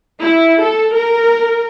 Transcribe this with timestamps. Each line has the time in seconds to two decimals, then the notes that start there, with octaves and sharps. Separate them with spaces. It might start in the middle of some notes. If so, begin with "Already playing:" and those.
0.21 E4
0.60 A4
0.94 A#4